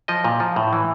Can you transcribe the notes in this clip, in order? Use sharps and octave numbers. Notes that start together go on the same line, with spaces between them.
F3 D#5
A#2
F3
A2
E3